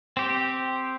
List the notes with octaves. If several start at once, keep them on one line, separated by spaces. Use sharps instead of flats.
C4 G4